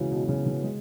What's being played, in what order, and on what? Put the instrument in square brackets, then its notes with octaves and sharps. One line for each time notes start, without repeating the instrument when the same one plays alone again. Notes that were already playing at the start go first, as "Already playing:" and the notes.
Already playing: [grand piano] C#3 E3 F#3 G#3
B2
B2
C#3
C#3
G#3